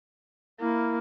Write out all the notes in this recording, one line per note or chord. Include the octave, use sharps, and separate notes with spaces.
A#3 E4